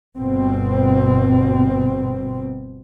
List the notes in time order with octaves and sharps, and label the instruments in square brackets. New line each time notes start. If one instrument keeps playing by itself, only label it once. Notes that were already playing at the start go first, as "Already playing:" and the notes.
[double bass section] G1 B2 C4